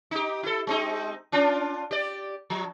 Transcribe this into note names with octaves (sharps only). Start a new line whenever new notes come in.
D#4 G4
E4 A4
G#3 C4 D#4
C#4 D4 F4
G4 D5
F3